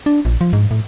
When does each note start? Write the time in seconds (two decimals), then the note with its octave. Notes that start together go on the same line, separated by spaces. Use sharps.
0.06 D4
0.25 A#1
0.41 F3
0.53 G#2
0.71 A2